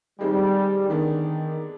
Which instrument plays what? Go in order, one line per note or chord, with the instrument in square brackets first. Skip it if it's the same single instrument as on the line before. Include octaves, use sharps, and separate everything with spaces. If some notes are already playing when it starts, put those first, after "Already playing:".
[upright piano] D#3 G#3 C4 D#4 [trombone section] G3
[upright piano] D3 G#3 B3 D4 [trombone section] D#3